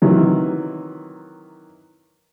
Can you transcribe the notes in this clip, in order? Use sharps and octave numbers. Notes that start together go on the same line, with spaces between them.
C3 D#3 E3 F#3